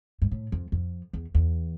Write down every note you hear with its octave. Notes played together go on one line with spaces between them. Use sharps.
G2
A2
F2
F2
E2
E2